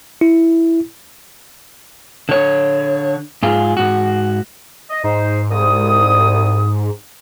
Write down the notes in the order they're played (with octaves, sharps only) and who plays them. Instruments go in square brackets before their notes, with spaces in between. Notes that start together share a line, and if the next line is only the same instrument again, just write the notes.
[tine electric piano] E4
[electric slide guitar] D3 C#5
G#2 F4 G#4
G#2 F#4
[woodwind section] D#5
[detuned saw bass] G#2 [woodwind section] D#4 C5
[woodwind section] C2 D#6